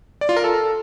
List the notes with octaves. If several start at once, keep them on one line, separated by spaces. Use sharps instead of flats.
D5
F4
A#4
A4